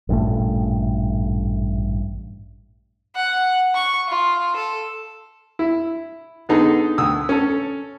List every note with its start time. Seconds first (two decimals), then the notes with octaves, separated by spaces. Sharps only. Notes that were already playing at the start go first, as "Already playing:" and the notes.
0.09 A1 G2 A#2 A3
3.15 F#5
3.74 C#6
4.08 F4
4.56 A4
5.59 E4
6.49 D3 B3 D#4 G#4 A4
6.98 D2 D#6 E6
7.29 C#4 A4